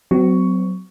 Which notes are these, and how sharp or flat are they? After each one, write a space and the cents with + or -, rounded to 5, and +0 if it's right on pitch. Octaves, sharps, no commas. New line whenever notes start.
F#3 +10 C4 -40 C#6 +10